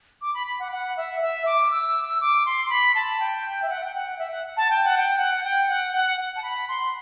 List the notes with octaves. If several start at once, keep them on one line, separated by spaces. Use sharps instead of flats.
D6
B5
B5
F#5
F#5
E5
E5
D6
E6
D6
C6
B5
A5
G5
E5
F#5
G5
F#5
E5
F#5
A5
G5
F#5
G5
F#5
G5
F#5
F#5
A5
B5
C6